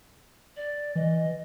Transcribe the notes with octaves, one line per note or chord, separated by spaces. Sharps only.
D5
E3 D#5